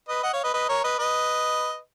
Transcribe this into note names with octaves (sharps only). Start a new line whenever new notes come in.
B4 D#5
D#5 F#5
C#5 F5
B4 D#5
B4 D#5
A#4 C#5
B4 D#5
B4 D#5